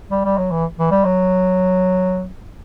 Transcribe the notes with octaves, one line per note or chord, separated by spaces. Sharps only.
G3
G3
F#3
E3
E3
G3
F#3